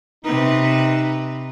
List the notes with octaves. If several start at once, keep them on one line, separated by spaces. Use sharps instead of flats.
C3 D#4 B4